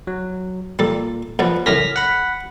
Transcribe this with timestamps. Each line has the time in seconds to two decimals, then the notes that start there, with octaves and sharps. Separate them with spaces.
0.07 F#3
0.79 A#2 G3 A4
1.39 A#1 F3 F#3 B4 D5
1.66 F#2 A2 C#3 F6 A#6 B6
1.96 F#5 B5